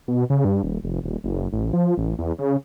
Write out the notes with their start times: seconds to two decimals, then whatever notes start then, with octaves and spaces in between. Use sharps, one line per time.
0.08 B2
0.30 C#3
0.45 G2
0.63 D#1
0.84 F1
1.04 D#1
1.24 F#1
1.53 A1
1.73 F3
1.97 A1
2.19 E2
2.39 C#3